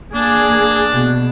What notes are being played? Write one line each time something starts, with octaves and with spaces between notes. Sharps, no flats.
A#3 D4 G#4
B2